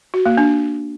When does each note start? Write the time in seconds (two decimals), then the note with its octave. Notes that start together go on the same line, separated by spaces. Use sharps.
0.14 F#4
0.26 A#3
0.37 D4